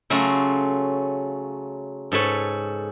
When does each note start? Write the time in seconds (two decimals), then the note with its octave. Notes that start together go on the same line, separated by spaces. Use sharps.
0.10 C#3 F#3 A3 F4 A#5
2.12 G#2 A4 B4 C#5